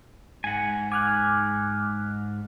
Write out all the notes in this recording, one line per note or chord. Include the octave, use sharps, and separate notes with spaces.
G#2 F#5 G#5
G#5 D6 F6 F#6